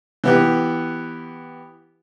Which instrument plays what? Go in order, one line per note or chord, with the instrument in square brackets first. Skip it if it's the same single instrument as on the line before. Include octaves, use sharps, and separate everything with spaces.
[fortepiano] E3 B3 G4